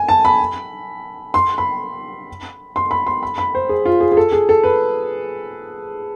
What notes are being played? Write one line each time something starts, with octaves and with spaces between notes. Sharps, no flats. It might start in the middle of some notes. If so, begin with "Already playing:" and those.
Already playing: G#5
A5
B5
C6
B5
C6
B5
C6
B5
B5
C5
G#4
F4
G#4
G#4
A4
G#4
A4
B4